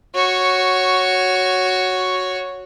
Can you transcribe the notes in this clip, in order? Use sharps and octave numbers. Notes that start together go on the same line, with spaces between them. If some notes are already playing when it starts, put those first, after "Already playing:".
F#4 C#5